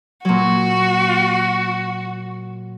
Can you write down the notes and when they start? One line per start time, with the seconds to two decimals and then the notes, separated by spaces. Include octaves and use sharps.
0.25 A#2 F#3 F#4